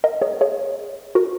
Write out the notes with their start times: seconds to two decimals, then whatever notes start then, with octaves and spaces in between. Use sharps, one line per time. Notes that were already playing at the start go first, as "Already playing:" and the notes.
0.04 A#4 D#5
0.22 G#4 C#5
0.41 G#4 C#5
1.15 F#4 A#4